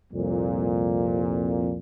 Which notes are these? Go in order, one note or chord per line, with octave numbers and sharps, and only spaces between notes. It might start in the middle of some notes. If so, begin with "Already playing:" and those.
C2 F2 A#2